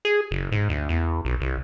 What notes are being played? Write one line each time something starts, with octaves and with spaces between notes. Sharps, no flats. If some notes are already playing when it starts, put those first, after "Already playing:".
G#4
F#1
G#2
D2
E2
B1
C2